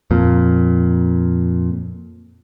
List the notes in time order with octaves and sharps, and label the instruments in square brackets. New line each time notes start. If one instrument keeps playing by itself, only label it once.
[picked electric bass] F2 A#2